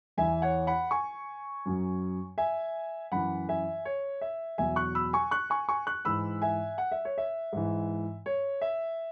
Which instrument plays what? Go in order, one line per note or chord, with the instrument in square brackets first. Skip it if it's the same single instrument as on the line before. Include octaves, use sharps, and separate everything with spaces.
[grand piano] E2 E3 E5 G#5
C#5 F#5
F#5 B5
G#5 C#6
F#2 F#3
E5 G#5
F#2 E3 F#5 B5
E5 G#5
C#5
E5
E2 B2 F#3 E5 G#5
C#6 F#6
B5 E6
G#5 C#6
C#6 F#6
G#5 C#6
G#5 C#6
C#6 F#6
G#2 E3 B5 E6
E5 G#5
F#5
E5
C#5
E5
G#2 E3
C#5
E5